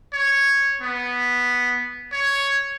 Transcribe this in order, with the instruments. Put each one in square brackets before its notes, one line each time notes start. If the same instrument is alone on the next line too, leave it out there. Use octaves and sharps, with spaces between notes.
[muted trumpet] C#5
B3
C#5